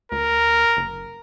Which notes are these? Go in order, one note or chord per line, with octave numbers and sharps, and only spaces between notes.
D2 A#4
F#1